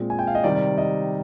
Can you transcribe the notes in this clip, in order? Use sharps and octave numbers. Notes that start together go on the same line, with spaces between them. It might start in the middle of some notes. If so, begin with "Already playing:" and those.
Already playing: A#2 G#3 C4 F4
G#5
G5
F5
D#5
C3 D#3 G3 D5
D5
D#5